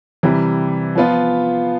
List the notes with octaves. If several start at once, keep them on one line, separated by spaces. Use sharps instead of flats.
C3 E3 G3
F3 B3 F4